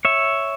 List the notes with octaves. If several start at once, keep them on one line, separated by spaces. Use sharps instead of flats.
C#5 E5